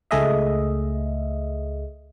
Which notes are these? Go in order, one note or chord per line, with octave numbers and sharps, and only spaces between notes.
C#2 A3 G#4 D#5 E5